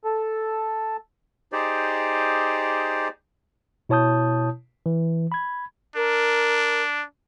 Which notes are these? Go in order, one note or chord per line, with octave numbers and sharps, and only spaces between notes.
A4
D#4 G4 G#4 C5 D5
B2 E4 C#5 A5 D#6 G6
E3
B5 G#6
D4 A#4